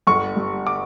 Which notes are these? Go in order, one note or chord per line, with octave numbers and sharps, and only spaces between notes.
G1 C#6
G2
D6